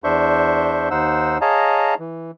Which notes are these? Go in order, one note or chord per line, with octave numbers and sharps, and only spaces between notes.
E2 D4 C5 E5 C#6 G6
D#2 D#4 C5 F#5 E6
G#4 C#5 D#5 F5 A5 A#5
E3